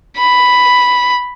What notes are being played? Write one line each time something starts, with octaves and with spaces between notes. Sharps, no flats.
B5